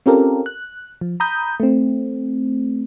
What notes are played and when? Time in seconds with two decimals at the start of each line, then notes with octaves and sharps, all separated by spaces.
0.06 C4 C#4 F4 G4 A4 A#4
0.46 F#6
1.01 F3
1.20 A#5 B5 D#6 G6
1.60 A3 C4